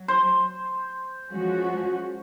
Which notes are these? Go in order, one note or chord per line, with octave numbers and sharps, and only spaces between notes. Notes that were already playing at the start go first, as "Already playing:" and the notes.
Already playing: F#3
C5
F3 G#3 C#4 F#4